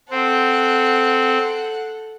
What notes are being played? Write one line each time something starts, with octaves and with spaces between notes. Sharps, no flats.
C4 A4 F#5